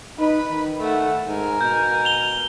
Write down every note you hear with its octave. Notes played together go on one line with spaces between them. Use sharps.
D#4 B4 B5
D#3
A3 F#5
G#2 A#4 G#5
B2 G6
F7 G7